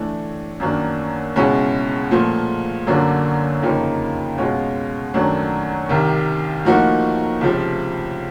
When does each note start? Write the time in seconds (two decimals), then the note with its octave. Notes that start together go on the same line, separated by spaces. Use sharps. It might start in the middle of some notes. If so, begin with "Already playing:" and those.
Already playing: A2 E3 A3 D4
0.60 F#2 D#3 F#3 A#3 D4
1.36 C#2 B2 G#3 C#4 E4
2.11 A#2 F3 A3
2.87 F#2 D3 F#3 A#3 D4
3.62 F2 C#3 F3 A#3 D#4
4.37 B2 G#3 C#4 F4
5.14 F#2 D#3 F#3 A3 D4
5.89 C2 C3 D#3
6.65 A2 F3 A#3 D#4 F#4
7.41 C#2 C3 F3